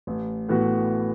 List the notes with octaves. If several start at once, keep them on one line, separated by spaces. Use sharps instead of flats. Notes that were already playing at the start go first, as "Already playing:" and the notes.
A1
A2 E3 B3 F#4